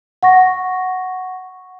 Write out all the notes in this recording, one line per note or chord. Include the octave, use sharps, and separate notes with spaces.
F#5 C#6 A#6